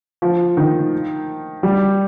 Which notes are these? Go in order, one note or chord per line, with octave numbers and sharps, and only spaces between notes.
F3
D#3
G3